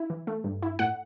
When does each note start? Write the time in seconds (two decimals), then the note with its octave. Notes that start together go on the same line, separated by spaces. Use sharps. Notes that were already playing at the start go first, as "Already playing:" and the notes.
Already playing: E4
0.10 E3
0.27 A3
0.44 G2
0.62 E4
0.79 A2 F#5